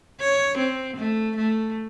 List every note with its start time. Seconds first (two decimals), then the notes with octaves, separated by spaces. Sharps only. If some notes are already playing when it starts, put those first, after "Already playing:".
0.21 C#5
0.58 C4
0.97 A3
1.36 A3